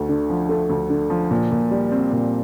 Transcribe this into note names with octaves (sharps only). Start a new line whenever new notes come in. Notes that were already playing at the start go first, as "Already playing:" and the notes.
Already playing: D2 A3
D3
F3
A3
D2
D3
F3
A#2
A#2
G3
C4
A#2